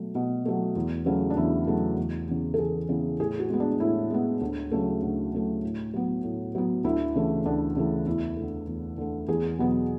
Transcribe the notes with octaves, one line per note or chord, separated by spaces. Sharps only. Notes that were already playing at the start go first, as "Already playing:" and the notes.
Already playing: B2 F#3 A3
B2
F#3 A3
E2
C#3 F#3 A3
D4
E2 E4
C#3 F#3 A3
E2
C#3 E3 B3
A4
E2 G#4
C#3 E3 B3
A2 G#4
F#4
G#3 B3
D4
A2 E4
G#3 B3
D2
C#3 F#3 A3
D2
C#3 F#3 A3
A2
F#3 B3
A2
F#3 B3
D2 E4
C#3 E3 A3
D2 D4
C#3 E3 A3
E2 E4
D3 A3
E2
D3 A3
E2 G#4
B2 F#3 B3